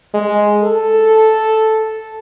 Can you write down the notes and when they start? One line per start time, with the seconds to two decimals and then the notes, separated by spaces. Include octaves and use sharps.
0.14 G#3
0.63 A4